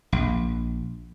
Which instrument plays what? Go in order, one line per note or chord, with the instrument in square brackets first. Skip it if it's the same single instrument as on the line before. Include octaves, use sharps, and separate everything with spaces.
[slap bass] A#1